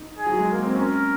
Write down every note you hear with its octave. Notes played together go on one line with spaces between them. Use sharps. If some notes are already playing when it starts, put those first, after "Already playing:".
Already playing: D#4
G#4
F#3
G#3
A#3
C4
C#4 A#4